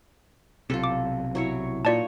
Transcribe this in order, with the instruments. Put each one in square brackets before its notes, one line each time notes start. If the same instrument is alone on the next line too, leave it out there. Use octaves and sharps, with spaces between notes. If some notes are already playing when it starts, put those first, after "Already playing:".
[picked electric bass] B1 C3 [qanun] F4 A4
[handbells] D6
[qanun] F#3 E4 C#5
[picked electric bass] A#2 [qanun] A#3 D#4 C#5 [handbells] F4 D5 A5